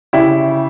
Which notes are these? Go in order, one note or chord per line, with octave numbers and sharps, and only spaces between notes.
C#3 E4 G4